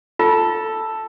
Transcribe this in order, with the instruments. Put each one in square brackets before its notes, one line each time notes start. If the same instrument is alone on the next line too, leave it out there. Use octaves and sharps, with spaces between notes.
[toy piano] F4 [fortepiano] A4